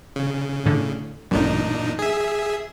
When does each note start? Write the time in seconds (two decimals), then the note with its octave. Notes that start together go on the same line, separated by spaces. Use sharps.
0.16 C#3
0.66 A2 D3
1.31 A1 F#2 A#2 D4 D#4
1.99 G#4 E5